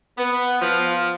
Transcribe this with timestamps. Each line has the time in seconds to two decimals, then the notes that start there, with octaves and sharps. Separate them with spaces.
0.18 B3
0.62 F3